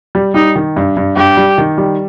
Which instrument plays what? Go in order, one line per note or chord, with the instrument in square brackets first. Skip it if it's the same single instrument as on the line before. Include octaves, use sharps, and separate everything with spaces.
[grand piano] G3
[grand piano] G3 [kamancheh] D#4
[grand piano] D#3
G2
G2
[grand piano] G2 [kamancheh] G4
[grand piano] G3
D#3
G3